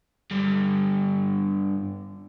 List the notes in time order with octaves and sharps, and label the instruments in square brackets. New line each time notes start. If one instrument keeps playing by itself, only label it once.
[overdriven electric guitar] G2 D3